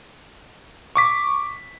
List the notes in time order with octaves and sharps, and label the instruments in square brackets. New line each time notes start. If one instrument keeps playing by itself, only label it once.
[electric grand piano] C#6 D6 B6